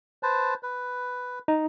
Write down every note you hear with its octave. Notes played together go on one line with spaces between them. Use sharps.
B4 C5 A5
B4
D#4